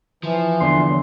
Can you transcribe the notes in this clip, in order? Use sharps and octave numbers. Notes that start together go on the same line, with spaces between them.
E3 F3
E2 D3 C6
F#3